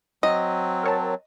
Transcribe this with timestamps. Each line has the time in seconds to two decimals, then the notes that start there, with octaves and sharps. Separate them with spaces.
0.23 F#3 C4 D#5
0.83 A#4 C#5 A5